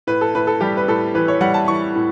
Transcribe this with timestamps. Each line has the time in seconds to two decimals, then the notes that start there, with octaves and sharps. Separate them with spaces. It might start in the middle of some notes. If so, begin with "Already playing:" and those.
0.07 A2 B4
0.21 A4
0.35 A2 B4
0.47 A4
0.61 G3 G4
0.77 B4
0.88 A2 A4
1.15 E3 B4
1.28 C#5
1.41 G3 F#5
1.54 A5
1.68 E3 C#6
1.95 A2